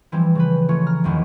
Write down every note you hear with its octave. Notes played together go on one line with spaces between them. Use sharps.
E3 F3 G3 C4
C#3 C4 B4
A3 C#4 F4 C#5
A#5 F6
F#1 B1 E2 D#3 G#3 B3